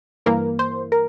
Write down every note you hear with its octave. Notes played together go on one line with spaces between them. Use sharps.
G2 E3 A#3 A#4
C5
A#4